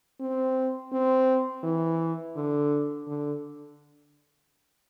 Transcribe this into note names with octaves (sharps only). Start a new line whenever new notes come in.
C4
C4
E3
D3
D3